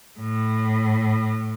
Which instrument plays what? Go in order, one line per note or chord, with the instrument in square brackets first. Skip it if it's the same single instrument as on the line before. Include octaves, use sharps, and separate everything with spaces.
[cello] A2